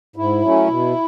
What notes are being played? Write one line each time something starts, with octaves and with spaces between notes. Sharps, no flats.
G#2 E4
F#3 A3 C#4
B2